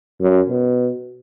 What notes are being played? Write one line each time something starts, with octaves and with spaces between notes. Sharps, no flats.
F#2
B2